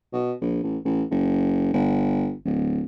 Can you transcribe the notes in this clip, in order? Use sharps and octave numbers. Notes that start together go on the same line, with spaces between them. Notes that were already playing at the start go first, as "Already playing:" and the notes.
B2
A#1
A1
A1
F#1
G1
D1